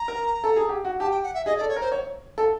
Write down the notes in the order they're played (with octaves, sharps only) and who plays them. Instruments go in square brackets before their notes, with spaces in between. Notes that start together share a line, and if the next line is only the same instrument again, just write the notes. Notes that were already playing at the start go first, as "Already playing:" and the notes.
Already playing: [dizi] A#5
[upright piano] A#4
A4
G#4
G4
F#4
[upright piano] G4 [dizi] A5
[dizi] G5
F#5
E5
[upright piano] G#4 [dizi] D#5
[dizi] D5
[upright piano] A4
[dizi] C#5
[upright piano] A#4
[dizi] C5
[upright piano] C#5
A4